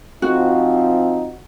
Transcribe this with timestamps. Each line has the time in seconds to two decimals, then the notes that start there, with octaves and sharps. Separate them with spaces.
0.22 F3 C4 D#4 F#4